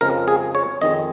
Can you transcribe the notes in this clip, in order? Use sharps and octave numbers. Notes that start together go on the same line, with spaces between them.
F2 C#3 F3 G#3 A#4
G#4
C#5
F2 D#3 G#3 D#5